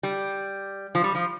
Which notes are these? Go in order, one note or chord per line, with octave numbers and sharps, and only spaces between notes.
G3
F3
G3
F3